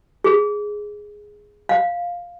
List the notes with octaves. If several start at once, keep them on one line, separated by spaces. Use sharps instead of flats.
G#4
F5